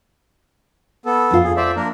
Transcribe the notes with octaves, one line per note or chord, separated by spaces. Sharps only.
B3 A4
F2 F4
G#4
C5 D5 E5
A#3 D4 A#4